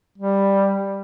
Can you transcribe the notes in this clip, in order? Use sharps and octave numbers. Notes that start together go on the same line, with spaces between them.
G3